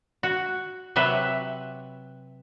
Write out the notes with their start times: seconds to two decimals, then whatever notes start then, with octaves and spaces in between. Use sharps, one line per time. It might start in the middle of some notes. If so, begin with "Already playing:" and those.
0.23 F#4
0.96 C3 F#3 B4 E5